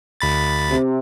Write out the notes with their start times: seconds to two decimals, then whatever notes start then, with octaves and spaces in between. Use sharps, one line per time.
0.21 D2 B5 A6
0.69 C3